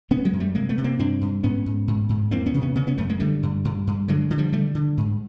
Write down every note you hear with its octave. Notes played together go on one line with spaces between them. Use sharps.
C#3 B3 C#4
F#3 G#3
F#2
G3 A3
C3 G#3 A#3
A3 B3
C3
A#3 C4
G2 C4 D4
G2
G#2 B3 C#4
G#2
G#2
G#2
E2 A#3 C4
B3 C#4
C3
B3 C#4
C#3 B3 C#4
B3 C#4
F#2 A3 B3
G#3 A#3
D3 G3 A3
G2
G2
G2
D3 F#3 G#3
D3
F3 G3
D3 G3 A3
D3
G#2